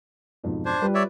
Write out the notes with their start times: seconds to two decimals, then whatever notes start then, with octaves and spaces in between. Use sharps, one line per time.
0.44 B1 F2 G#2
0.65 D4 C5 G#6
0.82 G3 F4 B4
0.95 C#5 D5 E5